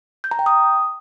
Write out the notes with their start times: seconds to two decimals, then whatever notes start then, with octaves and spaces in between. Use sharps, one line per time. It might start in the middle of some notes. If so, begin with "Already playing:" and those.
0.24 G6
0.31 A#5
0.39 G5
0.46 D#6